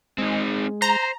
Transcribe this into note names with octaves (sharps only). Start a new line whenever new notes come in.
G#3 C4 D#4
C5 A#5